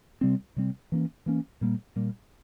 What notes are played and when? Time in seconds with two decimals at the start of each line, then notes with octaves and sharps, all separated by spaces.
0.21 C3 G3 C4
0.56 C3 G3 C4
0.92 E3 A#3 C#4
1.26 E3 A#3 C#4
1.61 A#2 G3 A#3
1.96 A#2 G3 A#3